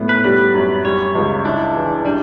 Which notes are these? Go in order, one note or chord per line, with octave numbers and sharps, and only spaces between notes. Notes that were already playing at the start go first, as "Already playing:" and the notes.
Already playing: A2 B3
B4
G3 B4
F#2
G3 C#5
C#2
D4 E4
E3
G3 D4